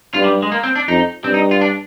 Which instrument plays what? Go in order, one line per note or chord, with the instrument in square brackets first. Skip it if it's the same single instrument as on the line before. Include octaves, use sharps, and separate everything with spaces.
[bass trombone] G2 [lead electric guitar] F4
[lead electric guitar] G3
G#3
A#3
C4
D4
[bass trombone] F2 [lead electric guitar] D#4
[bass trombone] G2 [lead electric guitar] C4
[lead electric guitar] D#4
F4
D4